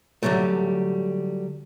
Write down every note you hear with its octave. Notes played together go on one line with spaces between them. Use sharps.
D3 D#3 F#3 G3 A3